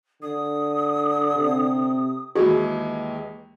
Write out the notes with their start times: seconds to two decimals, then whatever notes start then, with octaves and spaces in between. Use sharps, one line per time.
0.22 D3 D#6
1.35 C3
2.35 D#2 E3 G#3 F#4 G#4